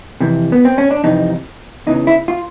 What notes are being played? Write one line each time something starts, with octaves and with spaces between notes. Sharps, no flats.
F2 C3 E3
B3
C4
C#4
D4
F2 C3 E3 D#4
E2 C#3 E3 D#4
E4
F4